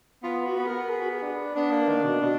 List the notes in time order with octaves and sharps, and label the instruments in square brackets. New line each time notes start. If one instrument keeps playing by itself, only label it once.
[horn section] B3 [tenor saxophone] F4
[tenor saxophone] F#4
[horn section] B3
[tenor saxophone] A#4
G#4
F#4
G#4
D4
[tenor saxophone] B3 [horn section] D4
[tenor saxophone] A#3
D#3
B2
B2